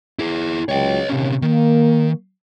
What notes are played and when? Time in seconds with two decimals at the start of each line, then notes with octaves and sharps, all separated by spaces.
0.19 E4 G#4
0.69 C#2 F#3 C#5 D#5 G5
1.09 D#2 C3 C#4
1.42 D#3 A#3